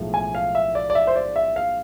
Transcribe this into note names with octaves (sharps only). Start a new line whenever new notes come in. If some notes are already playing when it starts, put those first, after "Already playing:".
Already playing: B1 A2 F3 G#3
G#5
F5
E5
D5
D5
E5
C5
D5
E5
F5